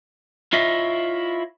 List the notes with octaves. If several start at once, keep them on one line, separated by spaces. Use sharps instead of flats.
E4 F4 C#5 D#5 E5